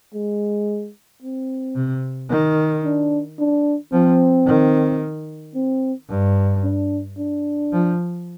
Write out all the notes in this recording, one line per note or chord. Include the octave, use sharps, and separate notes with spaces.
G#3
C4
C3
D#3
D4
D4
F3 C4
D#3
C4
G2
D4
D4
F3